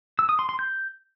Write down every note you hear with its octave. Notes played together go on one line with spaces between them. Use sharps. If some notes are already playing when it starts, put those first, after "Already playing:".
E6
D#6
C6
C6
G6